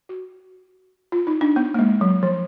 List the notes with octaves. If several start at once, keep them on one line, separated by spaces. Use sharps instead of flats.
F#4
F4
D#4
D4
B3
A#3
G#3
F#3
F3